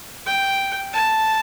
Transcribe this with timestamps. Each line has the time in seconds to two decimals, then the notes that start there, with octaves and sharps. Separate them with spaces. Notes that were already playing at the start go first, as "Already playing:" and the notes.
0.26 G5
0.93 A5